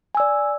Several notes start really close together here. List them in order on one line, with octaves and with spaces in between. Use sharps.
G#5 E6 D5